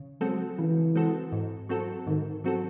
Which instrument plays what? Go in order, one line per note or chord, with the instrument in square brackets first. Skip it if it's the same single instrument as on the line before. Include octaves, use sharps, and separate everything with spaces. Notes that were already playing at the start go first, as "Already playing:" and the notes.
Already playing: [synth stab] C#3
[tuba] F#3 [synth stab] G#3 C4 F#4 A4
[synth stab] C#3 [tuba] E3
[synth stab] G#3 C4 F#4 A4
G#2
F#3 C4 F#4 A4
[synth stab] G#2 [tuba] D#3
[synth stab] F#3 C4 F#4 A4